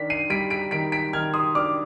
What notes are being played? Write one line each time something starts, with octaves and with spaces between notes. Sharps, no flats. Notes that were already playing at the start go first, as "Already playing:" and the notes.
Already playing: D#3 D4 B6
C7 D#7
G3 B6 D7
B6 D7
D#3 B6 D7
B6 D7
D#3 F6 G#6
C6 D#6
D4 D6 F6